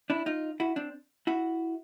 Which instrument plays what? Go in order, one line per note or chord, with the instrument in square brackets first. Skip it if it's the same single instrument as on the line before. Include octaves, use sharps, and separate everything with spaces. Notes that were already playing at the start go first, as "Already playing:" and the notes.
[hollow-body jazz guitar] D4 E4
D#4 F4
E4 F#4
C4 D4
E4 F#4